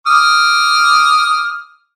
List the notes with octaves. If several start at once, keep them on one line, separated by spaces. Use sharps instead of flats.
D6 D#6 F6